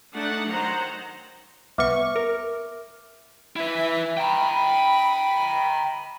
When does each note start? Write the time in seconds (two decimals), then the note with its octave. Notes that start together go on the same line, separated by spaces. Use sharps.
0.16 A3 D4 D#4 F#5
0.49 D#3 F#3 C5 F#5 A#5
1.78 C2 B3 E5 C#6 D6 F6
2.16 A#4
3.56 E4 B4 E5
4.17 G5 A#5 B5